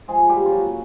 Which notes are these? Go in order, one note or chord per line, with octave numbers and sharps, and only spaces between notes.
F3 G#3 G#4
G3 G4
A#3
F4
F#3 F#4
C#3